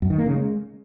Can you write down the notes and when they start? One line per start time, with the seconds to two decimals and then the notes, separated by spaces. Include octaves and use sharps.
0.02 F#2
0.10 D#3
0.18 A#3
0.26 C#3
0.34 G#3